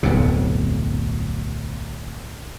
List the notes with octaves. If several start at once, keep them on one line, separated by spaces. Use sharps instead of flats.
D1 B1 F2 C3